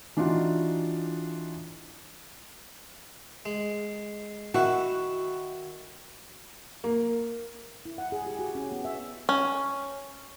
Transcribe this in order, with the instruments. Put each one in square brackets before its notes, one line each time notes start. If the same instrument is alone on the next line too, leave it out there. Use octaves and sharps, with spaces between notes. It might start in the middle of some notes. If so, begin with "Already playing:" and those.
[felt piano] E3 D4 D#4 F4 F#4
[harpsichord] G#3
[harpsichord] D#3 E4 [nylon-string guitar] F#4
[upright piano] A#3
[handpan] E4
F#5
G#4
G4
F#4
C#4
B3
E5
[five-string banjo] C#4